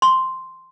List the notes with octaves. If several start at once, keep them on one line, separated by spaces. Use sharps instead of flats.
C6